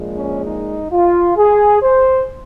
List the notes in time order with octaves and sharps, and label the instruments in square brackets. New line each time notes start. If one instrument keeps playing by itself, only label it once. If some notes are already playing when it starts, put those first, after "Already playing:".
Already playing: [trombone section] A#1 A#2 G#3
C#4
D#4
F4
G#4
C5